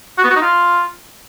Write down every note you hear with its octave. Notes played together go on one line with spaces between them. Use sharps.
F#4
B3
F#4
D#4
F4